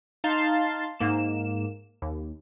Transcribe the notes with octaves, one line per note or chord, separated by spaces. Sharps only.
D#4 F5 A5 C6 A6
G#2 A#3 E7
D#2